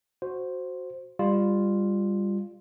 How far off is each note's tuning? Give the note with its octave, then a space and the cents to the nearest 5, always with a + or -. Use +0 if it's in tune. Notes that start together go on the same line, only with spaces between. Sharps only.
F#4 -5 C5 +0
G3 +25 F4 +0